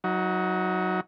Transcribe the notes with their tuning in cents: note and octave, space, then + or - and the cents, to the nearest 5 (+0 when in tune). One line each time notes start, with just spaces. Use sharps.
F#3 +0 D#4 +35